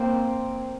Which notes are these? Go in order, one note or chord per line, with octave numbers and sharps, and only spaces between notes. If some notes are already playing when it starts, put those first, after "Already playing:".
Already playing: A#3 C4